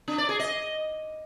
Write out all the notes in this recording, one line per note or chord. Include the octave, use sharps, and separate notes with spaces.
D4
D5
G#4
D#5